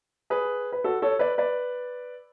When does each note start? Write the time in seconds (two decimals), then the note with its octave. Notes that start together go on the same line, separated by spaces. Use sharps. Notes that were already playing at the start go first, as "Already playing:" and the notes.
0.30 G#4 B4
0.72 B4
0.84 F#4 A4
1.02 A4 C#5
1.19 B4 D5
1.38 B4 D5